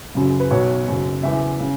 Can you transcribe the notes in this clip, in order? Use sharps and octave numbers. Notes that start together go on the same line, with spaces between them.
F#1 F#2 C#3 F#3
B4
B1 B2 F#3 C#5
F#1 F#2 F#3
F#1 E2 E3 E5
C#3